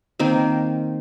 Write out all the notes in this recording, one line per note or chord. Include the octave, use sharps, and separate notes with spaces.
D#3 A#3 C4